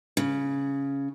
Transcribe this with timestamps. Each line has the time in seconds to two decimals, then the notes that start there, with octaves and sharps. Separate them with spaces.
0.17 C#3